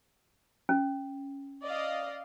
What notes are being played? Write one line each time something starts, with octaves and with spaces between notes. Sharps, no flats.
C#4
D5 D#5 F5